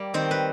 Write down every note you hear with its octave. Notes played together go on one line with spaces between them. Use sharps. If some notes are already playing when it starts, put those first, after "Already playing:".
Already playing: G3 A#3
D#3 C4 C5
B4